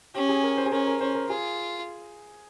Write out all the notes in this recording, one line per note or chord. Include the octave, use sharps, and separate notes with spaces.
C#4 G4
G#4
A#4
C5
G#4
C#4 A#4
A#4
C#4 C5
A#4
F4 G#4